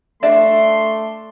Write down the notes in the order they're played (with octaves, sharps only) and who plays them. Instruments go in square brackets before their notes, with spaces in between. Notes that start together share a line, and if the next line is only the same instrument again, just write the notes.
[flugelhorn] A3 [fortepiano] D4 D5 [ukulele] E5 [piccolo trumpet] C6